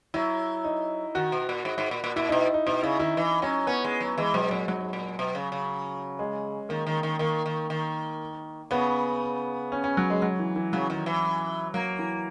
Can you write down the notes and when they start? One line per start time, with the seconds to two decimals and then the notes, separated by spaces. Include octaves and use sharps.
0.14 F#3 E4
0.64 D#4
1.15 D#3 F#4
1.32 B2
1.49 A#2
1.65 G#2
1.78 G#2
1.91 A#2
2.04 A#2
2.16 A#2 E4
2.29 B2 D#4
2.54 D#4
2.67 B2 D#4
2.83 C#3 E4
2.99 D#3 E4
3.17 E3 D#4
3.42 F#3 C#4
3.67 B3 C#4
3.84 G#3
4.00 F#3
4.18 E3 G#3
4.34 B2 F#3
4.51 A#2 F#3
4.68 G#2 F#3
4.93 A#2
5.19 B2
5.35 C#3
5.52 C#3
6.19 G#3
6.69 D#3 A#3
6.87 D#3
7.03 D#3
7.19 D#3 A#3
7.46 D#3
7.70 D#3
8.71 C#3 B3
9.72 C#4
9.84 C#4
9.97 F#3
10.10 G#3
10.22 F#3
10.39 E3
10.56 E3
10.73 C#3 F#3
10.90 D#3
11.06 E3
11.74 F#3 A#3
11.99 E3